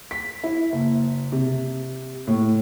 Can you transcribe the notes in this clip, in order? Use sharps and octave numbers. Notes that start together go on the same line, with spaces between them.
B6
E4
F#1
C3
A2